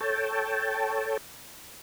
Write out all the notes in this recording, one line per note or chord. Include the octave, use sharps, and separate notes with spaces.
A4 C#5 G5 A5